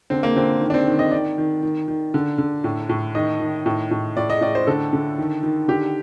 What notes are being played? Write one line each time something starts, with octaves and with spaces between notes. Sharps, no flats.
D3 C4
A#3
D3 C4
D#3
D4
C4
D#3
D#5
D#3 D5
D#3
D#3
D#3
D3
D3
A2
A2
D#3 D#5
D#3
A2
A2
A2 D5
D#5
A2 D5
C5
D3 A4
D3
D#3
D#3
D3 G4